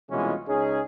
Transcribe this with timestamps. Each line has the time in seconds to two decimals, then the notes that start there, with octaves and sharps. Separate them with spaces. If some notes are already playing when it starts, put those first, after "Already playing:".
0.10 C2 B2 E3 G#3 C#4 F4
0.48 C#2 C#4 D#4 G#4